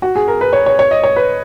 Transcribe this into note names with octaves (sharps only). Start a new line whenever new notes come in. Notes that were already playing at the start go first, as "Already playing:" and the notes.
F#4
G#4
A#4
B4
C#5
C#5
C#5
D#5
C#5
B4